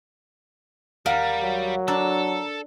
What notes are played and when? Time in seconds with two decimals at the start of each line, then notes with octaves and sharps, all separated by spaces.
1.06 D#2 G3 A#4 F5 F#5
1.43 F#3
1.88 D4 A4 A#5 E6